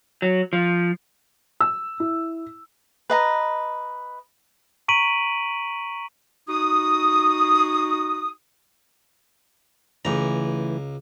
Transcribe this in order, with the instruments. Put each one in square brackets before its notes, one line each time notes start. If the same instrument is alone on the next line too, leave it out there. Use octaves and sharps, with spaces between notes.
[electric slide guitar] F#3
F3
[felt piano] E6
E4
[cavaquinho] B4 D#5 A#5
[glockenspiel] A#5 C#6 B6 D7 D#7 F#7
[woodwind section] D#4 F#4 D#6
[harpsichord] C#2 A#5 [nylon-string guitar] E3 A3